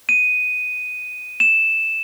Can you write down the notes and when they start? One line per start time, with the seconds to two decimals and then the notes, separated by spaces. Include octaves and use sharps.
0.09 D#7
1.40 E7